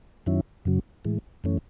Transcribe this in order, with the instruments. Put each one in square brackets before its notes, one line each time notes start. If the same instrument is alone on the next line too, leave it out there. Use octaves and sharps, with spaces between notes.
[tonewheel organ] F#2 D#3 F#3 C#4 E4
F#2 C#3 F#3
A2 E3 G#3
F#2 E3 A3 C#4